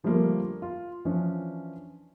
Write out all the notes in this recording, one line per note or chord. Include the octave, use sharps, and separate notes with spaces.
D3 F3 G3 A3 A#3 F4
F4
E3 F3 C#4 D4